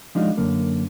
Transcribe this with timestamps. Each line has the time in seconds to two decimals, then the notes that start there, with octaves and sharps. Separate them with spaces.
0.15 F3 G#3 D4 D#4 F4 F#4
0.37 F#2 D3 A#3